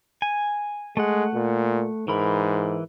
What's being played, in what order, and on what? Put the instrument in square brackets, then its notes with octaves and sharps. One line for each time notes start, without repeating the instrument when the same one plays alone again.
[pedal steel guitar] G#5
[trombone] G#3 [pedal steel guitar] A3 F#5
[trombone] A#2
[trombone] G#2 [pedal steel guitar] E3 A#4 B5